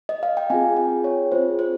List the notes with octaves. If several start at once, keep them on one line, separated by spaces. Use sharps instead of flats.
D#5
F5
G5
C4 F4 G#4 G#5
G5
C#5
C4 F4 G#4 C5
C5